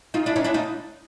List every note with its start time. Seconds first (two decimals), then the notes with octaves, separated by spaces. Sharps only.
0.14 D#4 F4
0.26 D4 E4
0.36 C#4 D#4
0.44 D4 E4
0.54 D#4 F4